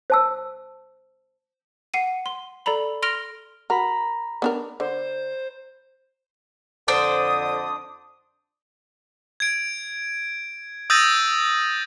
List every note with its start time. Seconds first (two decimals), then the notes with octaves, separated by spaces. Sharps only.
0.10 C5 A5 E6
1.94 F#5 C7 D#7
2.26 C6
2.66 A4 D5 A#5 B5
3.02 C6 F6 A#6 D7 F7
3.70 F#4 A#4 A#5 B5
4.42 B3 D4 A#4
4.80 D3 C5
6.88 F2 D3 D4 C5 D#6
9.40 G#6 D7
10.90 D#6 E6 G6 A6 A#6 D#7